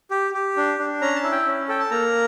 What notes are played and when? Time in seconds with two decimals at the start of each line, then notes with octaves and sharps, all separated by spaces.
0.11 G4
0.34 G4
0.57 D4
0.79 D4
1.01 C#4 A#5
1.16 A5
1.23 E4
1.32 G5
1.46 C#4
1.68 A4 G5
1.80 A5
1.91 A#3 A#5